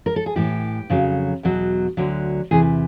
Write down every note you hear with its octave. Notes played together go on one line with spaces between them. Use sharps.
A#4
A4
G#4
A2 E3 G4
F2 C#3 F#3
E2 B2 F#3
D2 D3 F#3
E2 C3 E3 G#4